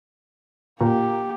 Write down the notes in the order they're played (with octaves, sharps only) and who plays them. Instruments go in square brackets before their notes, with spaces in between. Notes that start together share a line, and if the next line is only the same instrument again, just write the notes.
[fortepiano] A#2 [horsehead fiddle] A#3 G4